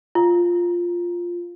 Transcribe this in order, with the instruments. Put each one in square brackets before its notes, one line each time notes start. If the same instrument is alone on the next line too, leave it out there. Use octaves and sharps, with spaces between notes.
[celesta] F4